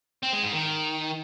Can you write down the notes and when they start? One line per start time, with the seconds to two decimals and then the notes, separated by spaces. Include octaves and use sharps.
0.23 C4
0.33 G#3
0.43 G#2
0.53 D#3